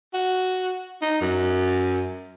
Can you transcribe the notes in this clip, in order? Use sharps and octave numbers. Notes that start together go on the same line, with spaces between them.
F#4
D#4
F#2